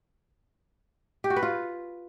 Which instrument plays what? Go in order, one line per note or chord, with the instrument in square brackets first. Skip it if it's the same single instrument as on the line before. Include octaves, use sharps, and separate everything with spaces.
[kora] G4
F#4
B4
F4